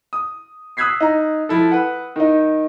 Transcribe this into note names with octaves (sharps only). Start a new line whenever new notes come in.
D#6
D#6 E6 F#6 G#6 B6 C7
D#4 A#5
F3 E4 A4
B4 F#5
D#3 D#4